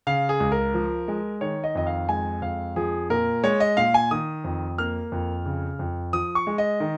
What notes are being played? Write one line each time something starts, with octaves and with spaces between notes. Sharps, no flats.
C#3 F5
G#4
C#2
A#4
F3
G#3
D#3 C#5
D#5
F2 D#5
F5
G#3 G#5
F2 F5
F3 G#4
A#2 A#4
G#3 C#5
D#5
A#2 F5
G#5
D#3 D#6
F2
A#3 F6
F2
C#3
F2
F3 D#6
C#6
G#3
D#5
D#3